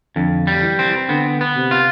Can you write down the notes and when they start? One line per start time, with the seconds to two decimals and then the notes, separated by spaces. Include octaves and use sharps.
0.16 F2 D3
0.47 G3
0.62 E3
0.79 C4
1.09 D3 B3
1.41 B3
1.55 C3
1.71 F4